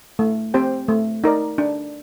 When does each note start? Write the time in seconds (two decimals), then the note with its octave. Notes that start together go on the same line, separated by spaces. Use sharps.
0.19 A3
0.54 C4 G4 C5 G5
0.88 A3
1.24 D#4 A#4 D5
1.58 D4